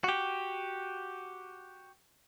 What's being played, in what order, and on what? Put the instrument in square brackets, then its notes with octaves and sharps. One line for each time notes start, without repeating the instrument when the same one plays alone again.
[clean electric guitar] F#4 G4